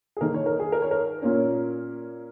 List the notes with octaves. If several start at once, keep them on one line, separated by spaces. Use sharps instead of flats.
G#4
D#3 A#3 D#4 A#4
C#5
A#4
G#4
A#4
C#5
A#4
A#2 A#3 C#4